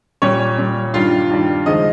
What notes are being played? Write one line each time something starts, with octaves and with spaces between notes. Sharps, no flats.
A#2 G3 C#4 C#5
A#2 G3 C#4
G2 D#3 G3 F4 F5
G2 D#3 G3
D#2 C#3 F3 G#3 D#4 D#5